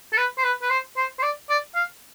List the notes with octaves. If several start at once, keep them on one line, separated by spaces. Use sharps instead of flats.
A4
B4
C5
B4
B4
C5
C5
C5
D5
D5
F5